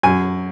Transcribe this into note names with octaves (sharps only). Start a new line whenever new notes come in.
F#2 G#5